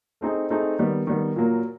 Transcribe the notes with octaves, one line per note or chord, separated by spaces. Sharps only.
A3 C4 D#4 G#4
A3 C4 D#4 G#4
D#3 G3 B3
D#3 G3 B3
A#2 F#3 A#3